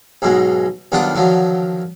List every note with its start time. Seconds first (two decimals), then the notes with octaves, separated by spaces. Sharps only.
0.22 B1 G#2 B2 G#3
0.92 B1 D#3 G3 D4 F4 F#5
1.15 D3 D#3 F3 F#3